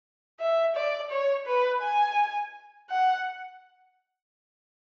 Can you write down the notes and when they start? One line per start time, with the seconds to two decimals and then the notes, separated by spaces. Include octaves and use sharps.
0.40 E5
0.75 D5
1.11 C#5
1.47 B4
1.82 G#5
2.90 F#5